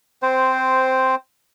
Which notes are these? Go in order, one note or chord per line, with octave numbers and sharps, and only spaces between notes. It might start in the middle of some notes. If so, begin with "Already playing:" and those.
C4 C5